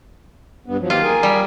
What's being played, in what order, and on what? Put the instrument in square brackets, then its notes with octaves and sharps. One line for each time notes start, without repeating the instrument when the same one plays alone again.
[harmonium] G2 B3
F3 F#3
[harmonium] D#3 A#3 G4 [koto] F4
[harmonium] G#4 A#4 G#5
[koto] G3